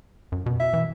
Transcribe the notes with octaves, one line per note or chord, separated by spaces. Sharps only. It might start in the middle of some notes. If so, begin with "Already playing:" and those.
F#2
B2
E5
E3